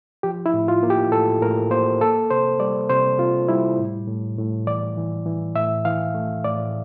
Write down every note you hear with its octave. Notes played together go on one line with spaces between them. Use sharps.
F3 G4
E4
A2
F4
A#3
G4
A2 A4
A2 A#4
A#3 C5
A#3 A4
C3 C5
G3 D5
C3 C5
C3 F4
G3 E4
A2
A2
A2
E3 D5
E3
E3
A2 E5
E3 F5
A3
A2 D5